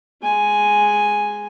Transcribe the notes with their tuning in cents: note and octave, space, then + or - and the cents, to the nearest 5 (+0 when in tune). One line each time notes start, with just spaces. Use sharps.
G#3 +0 G#5 +0